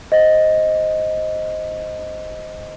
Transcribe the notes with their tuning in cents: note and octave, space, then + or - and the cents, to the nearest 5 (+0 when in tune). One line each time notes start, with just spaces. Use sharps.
C5 +0 D#5 +5